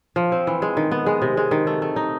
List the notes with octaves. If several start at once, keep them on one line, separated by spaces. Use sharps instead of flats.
F3
C4
E3
G#3
D#3
B3
G#3
C3
G#3
D#3
A3
A3
D#4